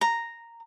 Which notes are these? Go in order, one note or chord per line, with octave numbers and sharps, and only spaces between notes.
A#5